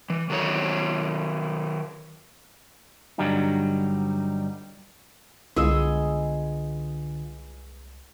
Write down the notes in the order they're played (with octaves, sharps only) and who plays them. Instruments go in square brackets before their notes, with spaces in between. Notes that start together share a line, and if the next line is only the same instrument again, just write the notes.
[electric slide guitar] E3
D#3 F#3 A4 C#5
[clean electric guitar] G2 D3 F#3 G3 D#4
[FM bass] C2 [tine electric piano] D3 F4 [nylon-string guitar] G#3 B3 [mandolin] G#4 D#5 E6